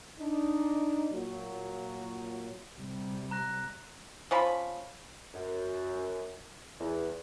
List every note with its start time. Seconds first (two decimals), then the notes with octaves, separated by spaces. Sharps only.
0.20 D4 D#4
1.11 A#2 F#3
2.76 C3 G3
3.31 A#5 F#6 A#6
4.31 F3 C#4 B5
5.34 F#2
6.80 E2